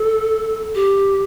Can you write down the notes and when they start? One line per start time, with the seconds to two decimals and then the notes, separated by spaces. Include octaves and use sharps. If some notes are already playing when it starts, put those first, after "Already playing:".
Already playing: A4
0.75 G4